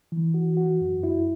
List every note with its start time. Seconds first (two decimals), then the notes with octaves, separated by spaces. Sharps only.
0.12 E3
0.34 F#4
0.57 F#4
0.81 F#2
1.03 E4